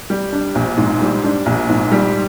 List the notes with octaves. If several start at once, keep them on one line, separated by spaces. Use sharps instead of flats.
G3
D4
A#1
G#2
G3
D4
A#1
G#2
G3